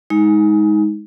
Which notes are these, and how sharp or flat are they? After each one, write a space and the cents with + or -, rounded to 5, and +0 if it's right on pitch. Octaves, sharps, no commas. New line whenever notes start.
G#3 +0 D#4 +25